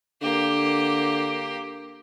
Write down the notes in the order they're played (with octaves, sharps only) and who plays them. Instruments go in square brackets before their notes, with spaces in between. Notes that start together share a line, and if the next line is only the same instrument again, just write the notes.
[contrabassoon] D3 [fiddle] A#3 G4